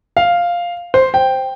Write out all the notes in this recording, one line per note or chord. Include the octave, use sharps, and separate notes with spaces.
F5
C5
G5